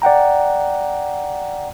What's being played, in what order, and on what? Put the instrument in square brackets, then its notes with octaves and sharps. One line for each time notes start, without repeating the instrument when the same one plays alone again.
[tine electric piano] D5 F#5 G5 A#5